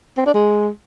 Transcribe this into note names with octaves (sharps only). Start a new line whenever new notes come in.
C4
D4
G#3